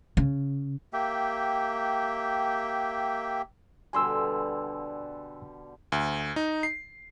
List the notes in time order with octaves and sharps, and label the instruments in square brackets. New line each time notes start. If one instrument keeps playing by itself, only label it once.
[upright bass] C#3
[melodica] A#3 G4 E5 G5
[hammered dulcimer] B2 D3 G3 [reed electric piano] G#5 C6 E6
[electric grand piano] D2
D#4
C7